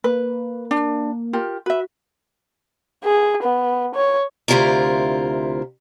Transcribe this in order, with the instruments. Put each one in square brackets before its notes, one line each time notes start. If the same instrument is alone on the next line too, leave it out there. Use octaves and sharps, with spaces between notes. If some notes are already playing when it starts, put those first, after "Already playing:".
[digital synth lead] A#3 [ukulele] B4
[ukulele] D4
F4 G4 A#4
[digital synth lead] F#4 [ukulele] B4 E5
[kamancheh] G#4
B3
C#5
[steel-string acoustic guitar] D2 C3 F#3 E4 F4 A#4